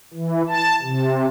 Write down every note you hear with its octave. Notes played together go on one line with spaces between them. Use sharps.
E3
A5
C3